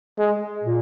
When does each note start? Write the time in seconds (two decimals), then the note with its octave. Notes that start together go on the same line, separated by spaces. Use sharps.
0.19 G#3
0.64 A#2